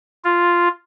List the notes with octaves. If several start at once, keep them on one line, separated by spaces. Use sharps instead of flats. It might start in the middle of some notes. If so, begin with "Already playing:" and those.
F4